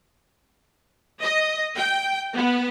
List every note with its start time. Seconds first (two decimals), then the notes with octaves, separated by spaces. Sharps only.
1.21 D#5
1.76 G5
2.35 B3